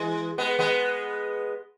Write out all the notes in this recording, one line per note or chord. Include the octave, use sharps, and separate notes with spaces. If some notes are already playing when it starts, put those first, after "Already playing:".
Already playing: E3 G#3
G#3 B3
G#3 B3